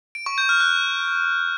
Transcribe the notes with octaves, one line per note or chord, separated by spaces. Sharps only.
D7
C#6
G6
F6
F#6